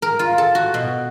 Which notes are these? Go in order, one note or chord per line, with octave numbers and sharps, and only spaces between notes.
A#4
F4
A4
F#4
B2